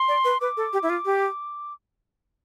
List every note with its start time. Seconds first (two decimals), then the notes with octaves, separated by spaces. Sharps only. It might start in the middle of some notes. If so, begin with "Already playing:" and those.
Already playing: C6
0.08 D5
0.25 B4
0.41 B4 D6
0.57 A4
0.73 G4
0.83 E4
0.90 F4
1.05 G4